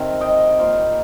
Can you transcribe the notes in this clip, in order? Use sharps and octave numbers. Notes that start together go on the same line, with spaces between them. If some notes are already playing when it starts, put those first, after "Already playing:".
Already playing: C3 D#3 G3 C4 A#4 F5 A#5
D#5 G5
A#2 A#3 C5 F5